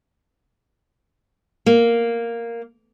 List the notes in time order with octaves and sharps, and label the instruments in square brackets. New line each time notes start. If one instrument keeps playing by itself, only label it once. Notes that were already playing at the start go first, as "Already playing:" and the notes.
[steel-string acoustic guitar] A#3